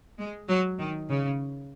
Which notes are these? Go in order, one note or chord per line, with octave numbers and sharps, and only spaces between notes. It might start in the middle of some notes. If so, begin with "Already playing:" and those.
G#3
F#3
D#3
C#3